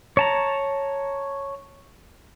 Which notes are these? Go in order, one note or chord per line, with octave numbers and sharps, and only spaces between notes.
C#5 A5 A#5